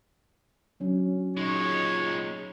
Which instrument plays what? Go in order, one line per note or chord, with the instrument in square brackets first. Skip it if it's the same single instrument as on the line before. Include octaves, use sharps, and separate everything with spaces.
[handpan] F#3 C#4 D4
[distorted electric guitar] A#2 G#3 [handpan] D#4 [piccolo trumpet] C#5